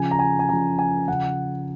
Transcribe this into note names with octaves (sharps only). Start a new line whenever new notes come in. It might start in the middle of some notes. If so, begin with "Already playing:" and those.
Already playing: C#3 F3 G#5
A#5
G#5
G#5
C#3 F3 A#5
G#5
C#3 F3 F#5